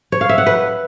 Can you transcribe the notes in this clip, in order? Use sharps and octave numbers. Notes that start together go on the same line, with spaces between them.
C#5
F5
E5
F#5
B4